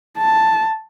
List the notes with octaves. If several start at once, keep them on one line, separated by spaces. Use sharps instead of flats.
A5